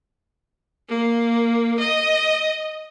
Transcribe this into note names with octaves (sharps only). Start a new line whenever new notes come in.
A#3
D#5